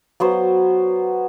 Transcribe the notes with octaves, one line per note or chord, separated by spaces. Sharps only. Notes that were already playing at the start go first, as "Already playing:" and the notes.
F#3 B3 C5